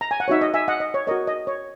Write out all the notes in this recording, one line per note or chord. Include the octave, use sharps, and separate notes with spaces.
A#5
G#5
F#5
D#4 F#4 C#5 E5
D#5
E5 G#5
D#5 F#5
D#5
C#5
F#4 A#4 C#5 D#5
D#5
C#5